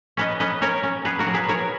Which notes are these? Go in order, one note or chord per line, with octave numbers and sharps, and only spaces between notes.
C#4 B4 D#5
C#4 B4 D#5
C#4 A#4 C#5
C#4
B3 G#4 B4
F#4 A#4
F#3
G#4 B4
B3 A#4 C#5